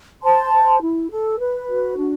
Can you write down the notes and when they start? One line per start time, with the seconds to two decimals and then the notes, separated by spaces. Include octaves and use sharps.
0.22 C5 A5 C6
0.52 C5
0.81 E4
1.10 A4
1.39 B4
1.68 F#4
1.97 D4